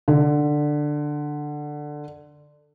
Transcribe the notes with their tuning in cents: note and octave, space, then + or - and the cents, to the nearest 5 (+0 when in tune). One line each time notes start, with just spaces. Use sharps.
D3 +10